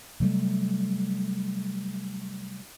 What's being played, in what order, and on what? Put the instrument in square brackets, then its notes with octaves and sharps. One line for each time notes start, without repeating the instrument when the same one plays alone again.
[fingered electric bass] C3 F#3 G3 A3